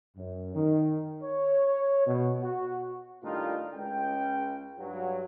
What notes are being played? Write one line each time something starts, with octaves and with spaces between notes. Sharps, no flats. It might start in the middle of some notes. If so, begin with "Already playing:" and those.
F#2
D#3
C#5
B2
F#4
A2 D#3 G3 D4 D#4 F4
C#2 G5
G2 F#3